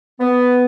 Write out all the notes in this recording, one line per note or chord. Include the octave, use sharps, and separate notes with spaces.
B3